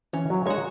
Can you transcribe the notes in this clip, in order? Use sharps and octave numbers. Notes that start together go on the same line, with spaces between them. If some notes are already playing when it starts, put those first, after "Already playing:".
E3 C#4
F#3
G#3 F#4 C#5